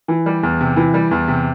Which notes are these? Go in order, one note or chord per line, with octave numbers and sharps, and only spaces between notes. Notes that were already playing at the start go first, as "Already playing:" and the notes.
E3
G3
E2
C3
E3
G3
E2
C3